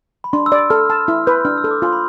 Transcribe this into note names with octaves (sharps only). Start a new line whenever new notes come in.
B5
D4 C6
E6
D5
E6
A4 F6
A5 F6
E4 F6
B4 G6
D4 F6
E6
A4
D6
F4 C6
B5